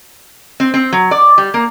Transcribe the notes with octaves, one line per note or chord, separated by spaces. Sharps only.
C4
C4
F#3
D5
G3
A#3